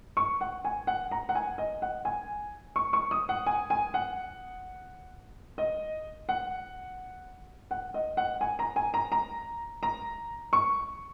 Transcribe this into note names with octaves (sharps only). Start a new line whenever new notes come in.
C#6
F#5
G#5
F#5
A#5
F#5
G#5
D#5
F#5
G#5
C#6
C#6
D#6
F#5
G#5
G#5
F#5
D#5
F#5
F#5
D#5
F#5
G#5
A#5
G#5
A#5
A#5
A#5
C#6